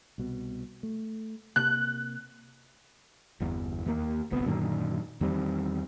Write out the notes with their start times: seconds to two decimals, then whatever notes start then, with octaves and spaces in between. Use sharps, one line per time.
0.18 C2 B2
0.83 A3
1.56 C3 A#3 F#6
3.40 G1 E2
3.86 D#2 A#3
4.30 D1 G1 C2 B3
4.46 F#2 A#2 D3 D#3
5.21 E2 D#3 G3 C4